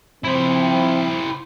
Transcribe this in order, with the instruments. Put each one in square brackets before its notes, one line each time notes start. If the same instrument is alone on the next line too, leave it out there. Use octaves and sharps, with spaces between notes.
[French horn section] F3 C4 [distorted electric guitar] E4 C5